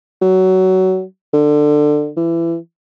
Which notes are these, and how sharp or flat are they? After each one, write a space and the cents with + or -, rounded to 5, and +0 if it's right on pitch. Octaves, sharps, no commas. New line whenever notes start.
F#3 +20
D3 +20
E3 +25